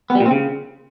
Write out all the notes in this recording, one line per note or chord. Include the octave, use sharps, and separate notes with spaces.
B3
G3
A#2
C4
C#3